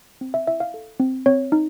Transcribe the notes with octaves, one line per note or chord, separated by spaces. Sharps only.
C4
E5
E4 E5
F5
A4
C4
C4 C#5
D#4